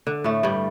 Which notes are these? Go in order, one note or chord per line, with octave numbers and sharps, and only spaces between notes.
D3
A2 A3
G2 G3